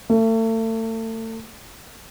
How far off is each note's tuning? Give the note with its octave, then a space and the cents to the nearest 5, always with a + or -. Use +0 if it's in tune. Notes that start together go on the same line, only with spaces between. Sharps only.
A3 +35